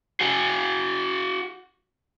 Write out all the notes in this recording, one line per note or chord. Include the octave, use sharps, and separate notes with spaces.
F#4 G#4